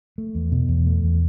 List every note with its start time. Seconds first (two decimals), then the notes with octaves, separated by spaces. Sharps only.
0.18 A3
0.35 E2
0.52 B2
0.69 E2
0.86 A3
1.04 E2